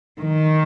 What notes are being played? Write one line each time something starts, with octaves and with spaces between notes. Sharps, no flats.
D#3